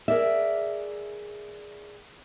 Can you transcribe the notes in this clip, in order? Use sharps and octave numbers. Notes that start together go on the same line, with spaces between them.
G#4 A#4 D5 E5